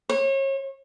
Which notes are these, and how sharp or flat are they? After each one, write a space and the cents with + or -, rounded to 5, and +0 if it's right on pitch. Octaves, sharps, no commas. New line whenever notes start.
C#5 -35